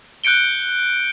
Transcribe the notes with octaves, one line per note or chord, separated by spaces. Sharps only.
F#6 G6 C#7 D7 G7